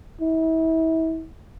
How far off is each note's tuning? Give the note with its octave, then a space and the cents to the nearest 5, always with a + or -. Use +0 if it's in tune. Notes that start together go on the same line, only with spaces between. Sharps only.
E4 -35